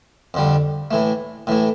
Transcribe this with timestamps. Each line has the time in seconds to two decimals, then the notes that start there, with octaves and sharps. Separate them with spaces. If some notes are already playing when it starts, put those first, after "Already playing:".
0.34 F2 D3 G3
0.91 A2 E3 A3
1.47 A2 E3 A3